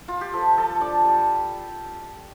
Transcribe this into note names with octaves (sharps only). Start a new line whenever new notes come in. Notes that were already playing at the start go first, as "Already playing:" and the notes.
F4
G4
F3 A4
F3 A4
D4 D5
G3